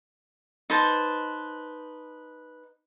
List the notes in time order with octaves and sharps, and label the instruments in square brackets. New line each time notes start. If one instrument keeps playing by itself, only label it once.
[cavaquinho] D#4 B4 C5 A5